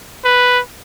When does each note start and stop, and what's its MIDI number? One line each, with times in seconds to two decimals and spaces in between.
0.25 0.59 71